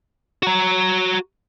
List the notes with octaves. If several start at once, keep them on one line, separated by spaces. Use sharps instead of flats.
F#4 A#5